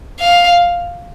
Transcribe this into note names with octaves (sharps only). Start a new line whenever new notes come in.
F5